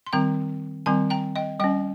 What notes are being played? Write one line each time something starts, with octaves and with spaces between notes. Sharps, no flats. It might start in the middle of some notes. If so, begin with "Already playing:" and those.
C6
D#3 G3 C4 G5 A#5
D#3 G3 C4 G#5 C6
G5 A#5
D#5 G5
G3 C#4 D#5 G5